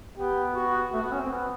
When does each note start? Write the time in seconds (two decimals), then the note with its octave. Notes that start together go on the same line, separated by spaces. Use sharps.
0.17 B3 G4
0.55 F#4
0.93 A3 F#4
1.03 B3
1.12 C#4
1.22 C4
1.31 B3